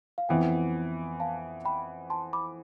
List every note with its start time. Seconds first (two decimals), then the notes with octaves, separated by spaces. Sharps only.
0.18 F5
0.29 F2 E3 B3 G5
1.20 F5 A5
1.65 G5 B5
2.10 A5 C6
2.33 B5 D6